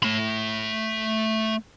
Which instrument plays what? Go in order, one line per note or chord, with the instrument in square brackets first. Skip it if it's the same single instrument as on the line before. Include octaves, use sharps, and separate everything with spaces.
[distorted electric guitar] A3 B5